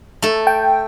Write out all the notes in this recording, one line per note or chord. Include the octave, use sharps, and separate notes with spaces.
A3 A4
G5